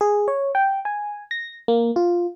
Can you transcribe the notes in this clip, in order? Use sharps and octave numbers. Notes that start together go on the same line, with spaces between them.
G#4
C#5
G5
G#5
A#6
A#3
F4